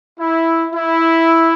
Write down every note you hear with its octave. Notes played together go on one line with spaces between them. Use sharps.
E4
E4